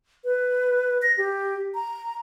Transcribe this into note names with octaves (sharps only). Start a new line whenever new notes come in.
B4
A#6
G4
A#5